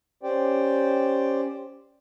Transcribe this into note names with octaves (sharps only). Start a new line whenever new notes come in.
C#4 G4 C5 D5 G5